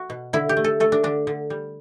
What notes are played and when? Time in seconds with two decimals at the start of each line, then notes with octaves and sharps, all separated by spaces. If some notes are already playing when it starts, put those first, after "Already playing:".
Already playing: F#4
0.10 B2
0.33 D3 E4
0.49 G4
0.57 A3
0.64 A4
0.80 A3 A4
0.92 D4
1.03 D3 D4
1.27 D3
1.50 G3